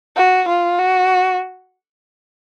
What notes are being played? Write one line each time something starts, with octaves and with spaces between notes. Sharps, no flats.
F#4
F4
F#4